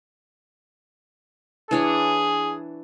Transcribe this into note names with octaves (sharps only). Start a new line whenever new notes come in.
E3 D4 G#4 C#5